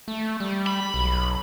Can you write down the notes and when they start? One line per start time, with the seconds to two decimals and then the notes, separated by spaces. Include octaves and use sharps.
0.08 A3
0.40 G3
0.67 B5
0.94 B1